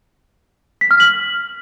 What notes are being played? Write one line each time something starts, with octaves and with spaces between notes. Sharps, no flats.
B6
F6
F#7